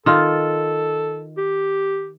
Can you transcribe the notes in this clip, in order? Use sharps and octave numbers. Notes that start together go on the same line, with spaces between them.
D#3 F4 A4
G4